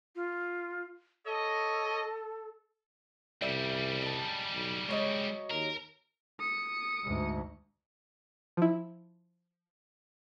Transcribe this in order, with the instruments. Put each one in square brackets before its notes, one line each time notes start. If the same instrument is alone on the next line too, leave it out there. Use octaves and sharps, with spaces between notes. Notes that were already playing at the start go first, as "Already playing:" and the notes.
[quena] F4
[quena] A4 [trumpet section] C#5 D#5
[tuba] C2 [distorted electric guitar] C#3 G3 [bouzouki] D5 E5
[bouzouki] D#4 A5
[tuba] B1
[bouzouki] F#3 C#5 D#5 [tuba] G#3
[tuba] D#2 [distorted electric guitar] A#4
[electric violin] D#6 C#7
[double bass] D2 G#2
[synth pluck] F3 E4